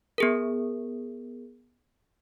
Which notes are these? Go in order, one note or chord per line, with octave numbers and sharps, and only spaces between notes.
B3 G#4 A#4